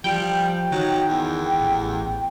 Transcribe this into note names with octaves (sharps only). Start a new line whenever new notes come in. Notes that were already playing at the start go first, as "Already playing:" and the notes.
F3 G3 G5
D#3 F#3
E2
A1